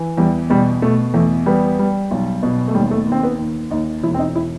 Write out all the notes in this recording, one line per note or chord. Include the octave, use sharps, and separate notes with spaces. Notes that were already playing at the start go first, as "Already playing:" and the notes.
Already playing: E3
E2 G3
B2 G3
B2 A3
E2 A3
G3 B3
G3
B1
B2
A3
D#2 G3
A3
D#2
C4
B3
D#2
D#2 D#4
E1 E4
C4
D#4
E4